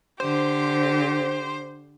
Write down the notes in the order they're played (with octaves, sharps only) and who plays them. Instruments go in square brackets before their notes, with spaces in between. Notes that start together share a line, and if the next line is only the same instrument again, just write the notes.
[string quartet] D3 G4 [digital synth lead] C5